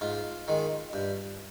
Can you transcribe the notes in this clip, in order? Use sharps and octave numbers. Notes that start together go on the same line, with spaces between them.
G#2 F4
D#3 G#3
G2